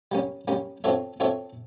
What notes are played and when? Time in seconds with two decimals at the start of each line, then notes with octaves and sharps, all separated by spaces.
0.12 G3 A#3 C#4
0.48 G3 A#3 C#4
0.84 C4 F4 A4 C#5 E5
1.20 C4 F4 A4 C#5 E5